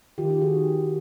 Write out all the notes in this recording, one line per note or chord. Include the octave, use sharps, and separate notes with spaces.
D#3 F4 G4
F4 G4
D#3 F#4 G#4